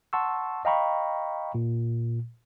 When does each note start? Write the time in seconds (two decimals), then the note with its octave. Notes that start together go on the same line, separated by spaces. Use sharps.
0.13 F#5 A5 C6 C#6 E6
0.65 D#5 F5 G5 A#5 B5 C#6
1.55 A#2